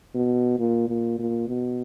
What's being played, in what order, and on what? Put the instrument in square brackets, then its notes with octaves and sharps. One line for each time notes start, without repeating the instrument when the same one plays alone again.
[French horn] B2
A#2
A#2
A#2
B2